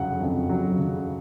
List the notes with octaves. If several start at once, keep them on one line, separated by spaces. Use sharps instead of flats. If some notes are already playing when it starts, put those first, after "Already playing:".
Already playing: F2 C#3 F#3 F#5
F2
F#3
C#3